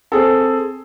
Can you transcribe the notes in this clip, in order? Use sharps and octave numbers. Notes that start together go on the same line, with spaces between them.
C4 G#4 A4